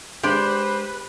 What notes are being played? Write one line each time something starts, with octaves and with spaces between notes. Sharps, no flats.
G#3 D4 G4 B4 C5 D5